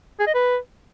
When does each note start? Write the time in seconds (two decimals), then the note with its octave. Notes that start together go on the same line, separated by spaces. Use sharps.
0.20 G#4
0.27 D#5
0.34 B4